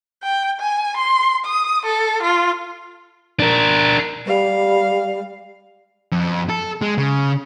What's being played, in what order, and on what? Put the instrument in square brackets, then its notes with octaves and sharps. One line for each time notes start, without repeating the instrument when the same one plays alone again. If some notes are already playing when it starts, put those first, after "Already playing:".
[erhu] G5
G#5
C6
D#6
A4
F4
[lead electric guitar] D4 A#4
[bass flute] G3 [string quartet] F5
[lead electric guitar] F2
A4
G#3
C#3